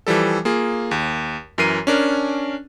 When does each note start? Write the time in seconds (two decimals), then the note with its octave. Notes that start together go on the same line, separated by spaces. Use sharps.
0.07 E3 F3 G3 A4
0.45 A#3 F4 G#4
0.91 D#2
1.58 F#2 E3 A#4 C7 D#7
1.87 C#4 D4 A#4